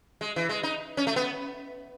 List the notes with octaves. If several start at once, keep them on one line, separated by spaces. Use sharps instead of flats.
G#3
E3
G#3
D#4
C#4
A3
B3